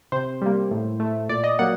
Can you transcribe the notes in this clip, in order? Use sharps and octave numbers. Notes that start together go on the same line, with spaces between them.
C3 C5
G3 A#3
A2
A3
A#2 D5
D#5
F#3 A#3 F#5